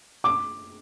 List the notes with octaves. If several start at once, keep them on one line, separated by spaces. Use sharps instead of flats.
D6